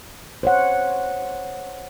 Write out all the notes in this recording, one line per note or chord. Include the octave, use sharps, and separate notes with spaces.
C5 C#5 F#5